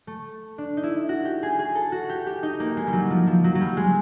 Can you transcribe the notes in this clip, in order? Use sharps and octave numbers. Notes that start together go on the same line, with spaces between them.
A3
D4
D#4
E4
F#4
G4
G#4
G#4
A4
F#4
G4
G4
D#4
A#3
G#3
G3
F#3
F3
F3
F#3
F#3
G3
G#3